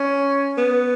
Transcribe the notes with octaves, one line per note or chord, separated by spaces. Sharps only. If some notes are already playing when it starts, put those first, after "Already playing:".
Already playing: C#4
B3